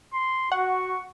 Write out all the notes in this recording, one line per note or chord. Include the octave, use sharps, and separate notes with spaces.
C6
F#4 F#5 C#6